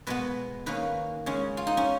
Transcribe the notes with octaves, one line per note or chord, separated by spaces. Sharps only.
B2 G#3 B3 B4
D#3 A#3 C#4 B4
C#3 G#3 C#4
F4
D#4
C#4